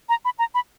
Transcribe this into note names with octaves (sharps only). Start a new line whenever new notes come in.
A#5
B5
A#5
B5